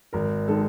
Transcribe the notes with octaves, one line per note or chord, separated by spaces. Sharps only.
G#1 A#4
D#3 G#3 A4